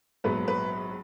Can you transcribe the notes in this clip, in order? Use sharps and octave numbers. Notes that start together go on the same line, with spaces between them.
A#1 G#2 F#3 B3 B4
B4